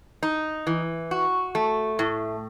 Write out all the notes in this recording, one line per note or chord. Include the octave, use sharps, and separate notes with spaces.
D#4
E3
F#4
A3
A2